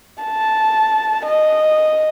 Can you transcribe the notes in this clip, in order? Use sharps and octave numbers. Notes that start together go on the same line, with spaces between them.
A5
D#5